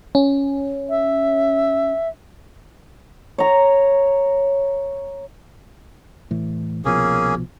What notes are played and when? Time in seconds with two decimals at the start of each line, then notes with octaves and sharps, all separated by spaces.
0.15 C#4
0.90 E5
3.38 C#5 A#5
6.31 A2 E3
6.85 C2 B2 F3 A#3 C#4 G#4